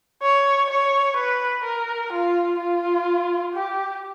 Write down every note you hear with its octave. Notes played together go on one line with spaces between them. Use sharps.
C#5
C#5
B4
A#4
F4
F4
G4